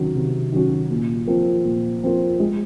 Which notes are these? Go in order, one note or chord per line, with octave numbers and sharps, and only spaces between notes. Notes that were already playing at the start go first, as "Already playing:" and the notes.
Already playing: C3 D#3 F#3 C#4 F#4
C3
D#3 F#3 C#4 F#4
A#2
F3 C4 F4 A#4
A#2
F3 C4 F4 A#4
G#3